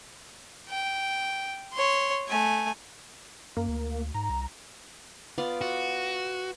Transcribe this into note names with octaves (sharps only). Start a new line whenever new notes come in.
G5
C#5 C6
A3 G#5
F#2 A#3
D2
G#2 A#5
C2
B3 F4 D5
F#4